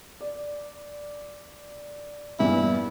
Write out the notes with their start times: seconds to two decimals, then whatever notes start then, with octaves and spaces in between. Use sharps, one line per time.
0.21 D5
2.39 A#1 E2 G2 E4